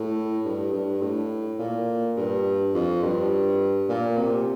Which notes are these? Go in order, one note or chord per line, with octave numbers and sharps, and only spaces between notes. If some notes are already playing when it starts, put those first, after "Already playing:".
Already playing: A2
G2
G2
A2
A#2
G2
F2
G2
A#2
C3